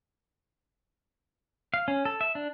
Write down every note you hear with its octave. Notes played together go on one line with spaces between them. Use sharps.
F5
C#4
A4
E5
D4